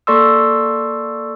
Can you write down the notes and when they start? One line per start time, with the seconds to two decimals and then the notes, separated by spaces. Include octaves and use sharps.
0.07 A#3 A4 D5 C6 C#6 E6